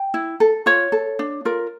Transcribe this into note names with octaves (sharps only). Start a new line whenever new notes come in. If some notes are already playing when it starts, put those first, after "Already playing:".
Already playing: G5
E4
A4
F4 C#5
A4
D4
F4 A#4